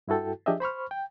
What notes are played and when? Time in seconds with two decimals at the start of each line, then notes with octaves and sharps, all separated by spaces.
0.08 G2 E4 F#4 A4 G5
0.46 F3 D4 G4 G#4 D#5 E5
0.60 C5 B5 C#6 F6
0.91 G5